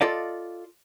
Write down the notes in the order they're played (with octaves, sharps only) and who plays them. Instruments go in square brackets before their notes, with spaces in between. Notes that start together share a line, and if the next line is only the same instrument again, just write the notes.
[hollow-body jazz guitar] F4 A4 D5 D#5 F5